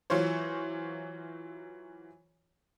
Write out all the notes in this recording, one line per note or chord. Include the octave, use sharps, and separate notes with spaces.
E3 F#3 F4 C5 C#5